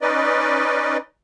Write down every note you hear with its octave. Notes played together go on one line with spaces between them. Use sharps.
C#4 D#4 B4 D5 D#5